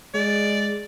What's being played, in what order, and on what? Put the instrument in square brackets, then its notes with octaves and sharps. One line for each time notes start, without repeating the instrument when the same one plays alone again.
[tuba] G#3 [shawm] D5